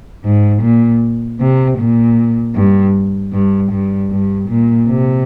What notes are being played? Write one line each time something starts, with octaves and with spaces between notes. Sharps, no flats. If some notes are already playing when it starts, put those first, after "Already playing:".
G#2
A#2
C3
A#2
G2
G2
G2
G2
A#2
C3